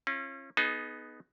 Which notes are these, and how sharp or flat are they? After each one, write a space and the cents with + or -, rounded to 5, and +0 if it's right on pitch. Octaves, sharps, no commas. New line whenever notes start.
C#4 -30 F4 -35
B3 +0 D#4 +0 G#4 +35